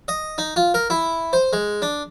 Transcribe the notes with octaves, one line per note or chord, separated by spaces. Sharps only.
D#5
D#4
F4
A#4
E4
C5
G#3
D4